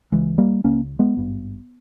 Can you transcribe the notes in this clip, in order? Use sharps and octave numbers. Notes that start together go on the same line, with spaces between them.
C#2 C#3 E3 G#3
G3 A#3
C#2 C#3 A#3 C#4
G#3 B3
G#1 G2